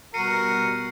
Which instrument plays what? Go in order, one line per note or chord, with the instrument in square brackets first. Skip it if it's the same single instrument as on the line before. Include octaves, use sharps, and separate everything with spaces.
[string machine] B2 G3 B3 [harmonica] F#4 A#4 [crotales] C7 C#7 D#7